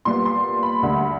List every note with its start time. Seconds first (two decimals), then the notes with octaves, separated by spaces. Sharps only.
0.05 A#2 G3 B3 C6
0.25 C6
0.63 B5
0.83 D2 D3 G3